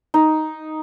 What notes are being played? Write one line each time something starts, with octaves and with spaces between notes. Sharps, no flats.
D#4